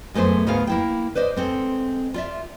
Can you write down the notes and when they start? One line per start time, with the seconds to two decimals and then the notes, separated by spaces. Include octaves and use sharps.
0.14 F#2 G#3 A3 B3 C5
0.47 D2 G#2 B3 G#4 A#4 F5
0.67 A#3 E4 G5
1.15 B4 C5 D5 D#5
1.36 G#3 C4 A4
2.14 F4 D5 E5